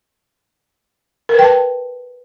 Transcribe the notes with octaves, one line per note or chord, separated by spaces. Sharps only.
A#4 B4 G5 A5